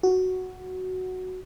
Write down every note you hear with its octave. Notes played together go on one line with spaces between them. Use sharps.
F#4